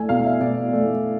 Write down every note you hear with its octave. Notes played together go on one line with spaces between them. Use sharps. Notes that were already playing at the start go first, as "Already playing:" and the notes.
Already playing: A3 G#5
B2 F5
E5
B2 D5
A3